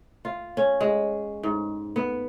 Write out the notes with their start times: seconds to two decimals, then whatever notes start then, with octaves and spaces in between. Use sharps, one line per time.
0.25 F4
0.57 C#4
0.81 G#3
1.43 G#2
1.96 B3